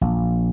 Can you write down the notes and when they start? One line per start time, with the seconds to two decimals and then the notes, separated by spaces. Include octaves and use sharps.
0.01 A#1